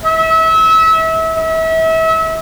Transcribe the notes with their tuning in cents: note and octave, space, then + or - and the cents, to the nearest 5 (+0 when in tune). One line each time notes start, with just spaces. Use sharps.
E5 -30
E5 -35